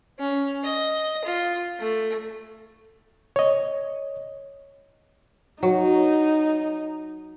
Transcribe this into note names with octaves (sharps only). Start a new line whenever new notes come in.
C#4
D#5
F4
A3
C#5 D#5
F#3 D#4